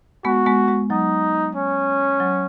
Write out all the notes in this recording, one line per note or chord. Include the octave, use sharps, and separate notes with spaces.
G#3 B3 F#4
G#3 B3
G#3
F#3 D#4
C#4
F#3